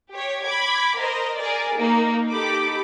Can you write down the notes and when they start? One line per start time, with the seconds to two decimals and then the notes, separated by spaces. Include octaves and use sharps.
0.12 G4 C#5
0.44 B5 D6 G#6
0.98 A#4 C5 D#5
1.37 G#4 A#4 D5
1.78 A#3 D#4
2.31 D#4 G4 A4 B5 D6